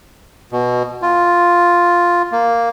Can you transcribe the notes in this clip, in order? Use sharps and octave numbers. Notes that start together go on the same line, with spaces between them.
B2
F4
A#3